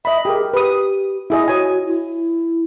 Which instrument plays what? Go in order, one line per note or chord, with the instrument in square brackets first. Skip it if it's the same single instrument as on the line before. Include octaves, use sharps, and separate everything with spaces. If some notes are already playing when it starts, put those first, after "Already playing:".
[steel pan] D#5 B5 [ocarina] E5
[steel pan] G4 A#4 [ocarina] G#4
[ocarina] G4 [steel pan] B4 D#6
[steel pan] E4 G#4 D#5
[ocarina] F#4 [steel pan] C#5 G#5
[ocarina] E4